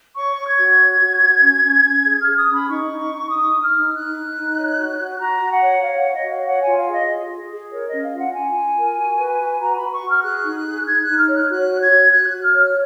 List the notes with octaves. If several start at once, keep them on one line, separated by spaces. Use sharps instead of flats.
C#5 C#6
C#5
G#6
F#4
C#5
F#4
F#4
C#4
C#4
C#4
G#4
G#4 F6
D#6
C#4
B5
D#4 C#6
D#4
D#4
D#4 D#6
D#4
F6
D#4
D#4 F#6
D#4
D#4
C#5
F#4
F#4
F#4 A#5
F#4
F#5
C#5
C#5 F5
F#5
C#5
D#5
F#4
F5
C#5 F#5
F4 G#5
F5
G#4
D#5
F4
G#4
G#4
A#4 C#5
D#5
C#4
F5
F4
F#5
F4 G#5
F4
A#4
F#4
B4
F#4
F#4 A#5
F#4 B5
C#6
F#4
F6
G#4 F#6
D#4
G#4
D#4 G#6
F#6
D#4
F6
C#5 F#6
F#4 F#6
C#5
G#6
F#4
F#4 F#6
F#6
F#4
F6
C#5
F6